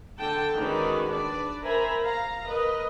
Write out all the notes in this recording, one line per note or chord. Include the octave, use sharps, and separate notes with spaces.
D3 G5 A5
D#3 G#3 C#4 F#4 B4 D5
D4 B4 D5
A#4 C5 E5 G#5 A#5 B5
F5 A#5
A#4 B4 D#5